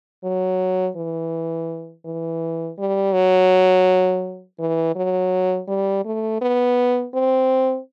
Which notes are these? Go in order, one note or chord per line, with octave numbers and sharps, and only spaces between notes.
F#3
E3
E3
G3
F#3
E3
F#3
G3
A3
B3
C4